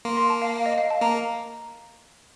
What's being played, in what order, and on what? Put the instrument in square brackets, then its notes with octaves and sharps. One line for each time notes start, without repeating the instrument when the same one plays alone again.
[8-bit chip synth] A#3 [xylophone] C6
[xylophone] C6
A5
F5
F5
D#5
F5
A5
[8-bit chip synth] A#3 [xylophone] A#5